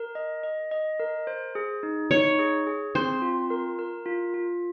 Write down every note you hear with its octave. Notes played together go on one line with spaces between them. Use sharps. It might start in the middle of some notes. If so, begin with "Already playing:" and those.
Already playing: A#4
D#5
D#5
D#5
A#4
C5
G#4
D#4
D#4 C#5
G#4
G#4
C4 C5
F4
A#4
A#4
F4
F4